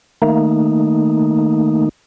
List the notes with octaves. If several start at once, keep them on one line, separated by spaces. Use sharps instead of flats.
D#3 A3 A#3 D#4